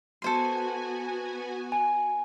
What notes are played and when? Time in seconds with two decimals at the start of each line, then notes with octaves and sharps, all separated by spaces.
0.22 B3 F#4 A4 C5 G#5 C6
1.72 G#5